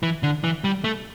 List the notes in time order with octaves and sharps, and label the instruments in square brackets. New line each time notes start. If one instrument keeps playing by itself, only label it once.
[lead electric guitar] E3
D3
E3
G3
A3